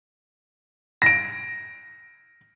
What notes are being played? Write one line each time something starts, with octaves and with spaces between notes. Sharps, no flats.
A#6 D7